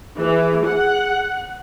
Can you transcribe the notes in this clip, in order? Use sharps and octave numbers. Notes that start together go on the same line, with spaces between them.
E3 G#4
F#5